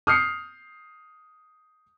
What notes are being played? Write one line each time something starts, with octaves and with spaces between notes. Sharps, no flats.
D#6 F6 G6 C7 C#7